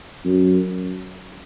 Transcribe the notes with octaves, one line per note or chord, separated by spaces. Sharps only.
F#2